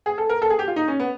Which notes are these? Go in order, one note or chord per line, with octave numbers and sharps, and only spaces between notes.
G#4
A4
A#4
A4
G#4
G4
F4
D#4
C#4
B3